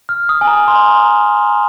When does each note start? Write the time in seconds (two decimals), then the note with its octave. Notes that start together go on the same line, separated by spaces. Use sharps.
0.09 F6
0.29 D#6
0.41 G#5
0.47 A#5
0.68 C6
0.87 C6
1.06 A#5